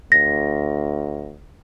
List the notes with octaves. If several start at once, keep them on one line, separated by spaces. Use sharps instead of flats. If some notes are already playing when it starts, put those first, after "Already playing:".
D2 A#6